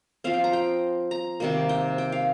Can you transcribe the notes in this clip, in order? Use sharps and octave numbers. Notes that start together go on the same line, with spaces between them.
F3 C4 F5
G5
A#5
G5
A#5
C3 D#3 G3 A#3
G5
G5
F5